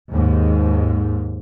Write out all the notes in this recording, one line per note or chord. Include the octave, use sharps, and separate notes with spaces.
D#2 G#2